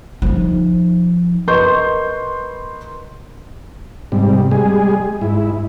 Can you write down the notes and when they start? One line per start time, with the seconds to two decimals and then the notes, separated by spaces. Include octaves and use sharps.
0.22 F3 D#4
1.48 A#4 B4 D#5 C6 C#6 G6
4.12 G#2 C3 G3
4.51 G3 G#3 G#4
5.21 G#2 E4